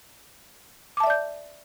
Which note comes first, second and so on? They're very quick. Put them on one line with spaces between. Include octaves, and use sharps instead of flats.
D6 A5 E5 D5 G6